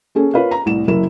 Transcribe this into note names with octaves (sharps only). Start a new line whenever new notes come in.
A#3 C#4 G#4 A4
F4 A#4 B4 C#5 F5
A#5
C2 A2 E7
F#1 F#2 E4 A#4 E7